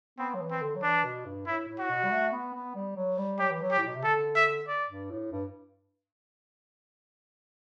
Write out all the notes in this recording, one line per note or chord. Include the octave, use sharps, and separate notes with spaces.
B3 C4
F#3
E3
C4
D3
F#3
E3 D4
B2
G2
A2 E4
A2
F#4
B2
G3
A3
B3
B3
G3
F#3
G3
F#3 G4
E3
F#3
G4
A2
B2
C3
D3 A4
E5
D5
G2
A2
G2